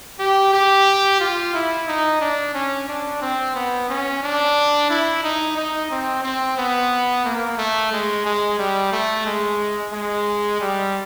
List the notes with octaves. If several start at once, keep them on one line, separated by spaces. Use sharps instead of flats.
G4
G4
F4
E4
D#4
D4
C#4
D4
C4
B3
C#4
D4
E4
D#4
D#4
C4
C4
B3
A#3
A3
G#3
G#3
G3
A3
G#3
G#3
G3